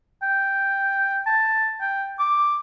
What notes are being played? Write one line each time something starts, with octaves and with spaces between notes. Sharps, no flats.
G5
A5
G5
D6